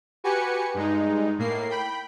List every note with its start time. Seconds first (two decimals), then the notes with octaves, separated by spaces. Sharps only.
0.24 F#4 G4 B4 G#5 C#7
0.74 G2 G#3 D#4
1.38 A2 A#3 C7
1.70 G5 B5